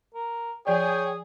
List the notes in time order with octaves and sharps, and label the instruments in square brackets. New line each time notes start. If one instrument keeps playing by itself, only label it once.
[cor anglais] A#4
[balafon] F3 D5 [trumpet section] G#4 [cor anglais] C#5 [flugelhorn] G5